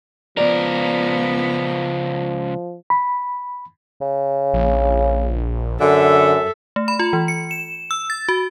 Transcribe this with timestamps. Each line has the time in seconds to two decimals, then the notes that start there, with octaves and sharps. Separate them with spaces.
0.37 C#2 F3 B3 A#4 D5
2.90 B5
4.01 C#3
4.53 A#1
5.80 F#2 D3 A4 E5
6.76 A3
6.88 B5
6.99 F4
7.13 E3
7.28 C#7
7.51 E7
7.91 E6
8.10 A6
8.29 F#4